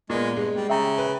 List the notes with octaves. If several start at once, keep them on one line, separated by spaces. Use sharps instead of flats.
A#2 G#3 B3
G2 G#3
G3
C#3 E5 G5 A#5
B4